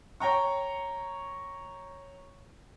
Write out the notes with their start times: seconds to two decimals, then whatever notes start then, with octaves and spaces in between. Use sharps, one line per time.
0.20 C#5 G5 A#5 C#6